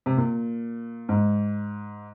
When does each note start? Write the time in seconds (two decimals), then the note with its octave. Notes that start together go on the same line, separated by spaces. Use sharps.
0.06 C3
0.17 A#2
1.09 G#2